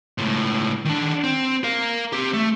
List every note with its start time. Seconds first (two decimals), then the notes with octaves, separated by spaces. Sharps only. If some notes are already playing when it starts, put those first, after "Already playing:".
0.18 C#2 A2
0.85 D#3 D4
1.24 C4
1.64 A#4 F5
2.13 C4 G4
2.34 A3